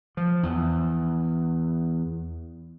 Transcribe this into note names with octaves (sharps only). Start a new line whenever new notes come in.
F3
E2